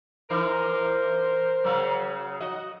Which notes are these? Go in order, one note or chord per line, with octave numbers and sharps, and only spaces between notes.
E3 D#4 A#4 C5
C#3 F#3
F#4 D#5